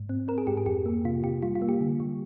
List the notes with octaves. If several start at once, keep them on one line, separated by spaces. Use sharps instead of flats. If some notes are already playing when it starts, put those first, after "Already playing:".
Already playing: G#2
C4
C4 A#4
G#4
G#2 G4
G#4
F2 G4
A#3
C3 F4
C3 G4
G3 F4
F4
A#3
G4
D3
G3